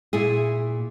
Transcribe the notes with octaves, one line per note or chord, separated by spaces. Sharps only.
A#2 E4 G#4